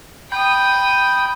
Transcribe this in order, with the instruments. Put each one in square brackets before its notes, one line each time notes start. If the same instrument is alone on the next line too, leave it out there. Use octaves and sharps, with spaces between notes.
[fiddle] G5 D#6 [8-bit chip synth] B5 G6